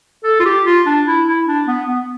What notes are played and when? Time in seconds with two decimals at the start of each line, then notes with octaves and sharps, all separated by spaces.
0.24 A4
0.40 F4
0.46 G4
0.65 F4
0.86 D4
1.06 E4
1.26 E4
1.47 D4
1.67 B3
1.87 B3